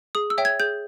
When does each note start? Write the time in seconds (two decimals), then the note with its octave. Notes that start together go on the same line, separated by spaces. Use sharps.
0.15 G#4 D#6
0.30 E6
0.38 C#5 E5 G5
0.45 G#6
0.60 G#4 G6